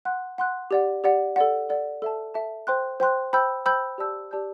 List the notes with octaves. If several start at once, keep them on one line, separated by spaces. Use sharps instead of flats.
F#5 C6 F#6
F#5 C6 F#6
G4 D5 F#5
G4 D5 F#5
A4 D5 F#5
A4 D5 F#5
A4 E5 A5
A4 E5 A5
C5 G5 C6 F#6
C5 G5 C6 F#6
C5 G5 B5 E6 G6
C5 G5 B5 E6 G6
G4 D5 A5 E6 G6
G4 D5 A5 E6 G6